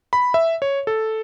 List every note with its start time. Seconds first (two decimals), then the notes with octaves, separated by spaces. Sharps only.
0.13 B5
0.34 E5
0.62 C#5
0.87 A4